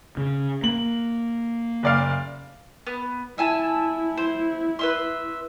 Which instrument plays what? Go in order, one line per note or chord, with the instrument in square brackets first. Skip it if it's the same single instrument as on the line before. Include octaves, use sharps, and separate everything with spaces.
[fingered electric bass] C#3
[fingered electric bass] A#3 [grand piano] F#7
[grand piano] F#1 D5 F5
[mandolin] B3
[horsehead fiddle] E4 [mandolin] E5 G#5 A5
[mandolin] C5
B4 E5 C6